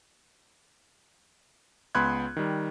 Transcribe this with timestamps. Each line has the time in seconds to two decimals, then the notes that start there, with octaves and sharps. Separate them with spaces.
1.95 C#2 B3 B5 C6 F#6 G#6
2.36 D#3 G3